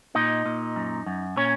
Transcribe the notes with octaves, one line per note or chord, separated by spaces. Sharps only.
A#2 D#4 D#5
A#2
F#2
F#2
A#2 C#4 C#5